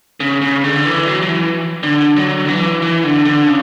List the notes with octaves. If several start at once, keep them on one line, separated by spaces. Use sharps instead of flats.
C#3
C#3
D3
E3
F#3
F#3
E3
D3
F#3
D3
E3
E3
D3
D3
C#3